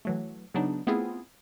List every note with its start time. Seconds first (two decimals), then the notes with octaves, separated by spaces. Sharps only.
0.05 E3 F#3 A3
0.54 C#3 F#3 B3 D4 D#4
0.87 A3 B3 C4 E4 F4 G#4